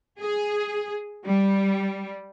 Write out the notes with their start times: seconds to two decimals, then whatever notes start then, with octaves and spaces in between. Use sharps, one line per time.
0.19 G#4
1.26 G3